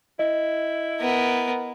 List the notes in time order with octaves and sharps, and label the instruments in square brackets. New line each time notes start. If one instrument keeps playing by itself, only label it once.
[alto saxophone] E4 [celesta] D#5
[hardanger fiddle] B3 A#4